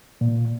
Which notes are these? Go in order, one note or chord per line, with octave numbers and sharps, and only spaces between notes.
A#2